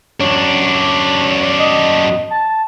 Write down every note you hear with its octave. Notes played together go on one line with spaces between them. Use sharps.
F#2 D4 C#5
D#5
A5